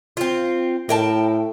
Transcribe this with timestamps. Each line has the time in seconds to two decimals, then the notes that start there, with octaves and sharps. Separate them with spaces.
0.17 C4 F4
0.89 A2 A#4 G5 A5